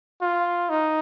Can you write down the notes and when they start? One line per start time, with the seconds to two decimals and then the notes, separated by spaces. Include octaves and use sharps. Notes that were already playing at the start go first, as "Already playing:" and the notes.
0.21 F4
0.70 D#4